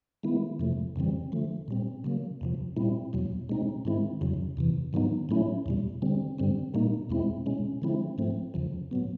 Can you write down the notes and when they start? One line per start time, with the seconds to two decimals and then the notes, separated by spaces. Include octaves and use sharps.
0.23 D#3 G#3 B3 E4
0.60 F2 C3 F3 A3
0.96 F2 C#3 E3 G3 C4
1.32 D3 F3 A3
1.68 A#2 G3 C4
2.04 C#3 F#3 A#3
2.41 E2 C3 F3
2.77 A#2 G3 C4 E4
3.13 E2 B2 F#3
3.49 B2 G#3 C4 D#4
3.85 G#2 D#3 G#3 C4 E4
4.21 F2 C#3 F#3
4.57 E2 C3 E3
4.93 G#2 D#3 F#3 B3 D#4
5.29 A2 F#3 A3 C#4 E4
5.66 E2 B2 G3
6.02 D3 G3 C4
6.38 G2 D3 G3 C4
6.74 A#2 G3 A#3 D#4
7.10 E2 B2 G#3 C4 E4
7.46 B2 G#3 C#4
7.82 D3 F3 G#3 C4 E4
8.18 G#2 F3 A3 C4
8.54 E2 C#3 F3
8.91 A2 F#3 B3